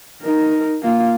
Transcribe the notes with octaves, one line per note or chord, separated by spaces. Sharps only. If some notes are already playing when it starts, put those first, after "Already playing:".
D#4 A#4
A#3 F4